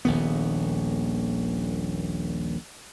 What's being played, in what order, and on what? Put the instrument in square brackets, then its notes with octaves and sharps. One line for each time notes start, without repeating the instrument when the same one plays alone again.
[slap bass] D#1 A#1 D#3 B3